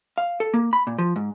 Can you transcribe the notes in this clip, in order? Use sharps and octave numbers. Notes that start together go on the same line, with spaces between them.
F5
A4
A#3
B5
A#2
F3
G#2